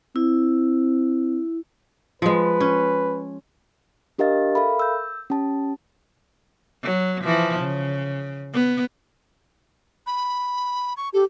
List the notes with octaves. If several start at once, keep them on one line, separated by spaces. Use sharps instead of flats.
C4 E4
F3 G#3 B4
C#4
D4 G4 A#4 D#5 F5 A6
A4 A#4 E5 F5 B5
E6 G6
C#4 G4 A5
F#3
E3 F3
C#3
B3
B5
C#6
G4 A4